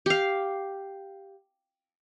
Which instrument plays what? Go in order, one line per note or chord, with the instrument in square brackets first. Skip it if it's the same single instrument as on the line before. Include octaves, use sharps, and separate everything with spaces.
[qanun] G4 F5